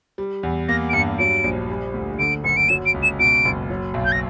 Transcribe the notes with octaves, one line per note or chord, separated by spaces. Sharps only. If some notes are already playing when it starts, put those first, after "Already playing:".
G3
E2
A#3 A#6
D7
G2 C#7
F#3 D7
A#1
G3
D2
D3 D7
F#1 C#7
D7
F#3 E7
D7
C#2
E7
B2 D7
F#1
F#3
B1
G6
A#6